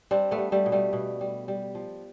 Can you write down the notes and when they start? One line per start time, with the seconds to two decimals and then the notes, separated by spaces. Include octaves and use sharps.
0.11 G3 C4 D4
0.31 A3 B3
0.38 G3
0.52 G3 A3
0.66 B2
0.72 G3 A3
0.93 B2
1.21 G3
1.48 G3
1.75 F3